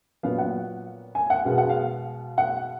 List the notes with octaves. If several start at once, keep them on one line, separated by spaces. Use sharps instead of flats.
A#2 F#3 B3 F5
F#5
G#5
F#5
B2 G#3 B3 F5
F#5
F5
F#5